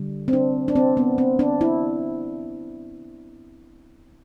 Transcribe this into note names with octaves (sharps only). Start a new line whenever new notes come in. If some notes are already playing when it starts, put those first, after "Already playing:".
Already playing: D3 G3
C4
D4
D4
C4
B3
C4
D4
E4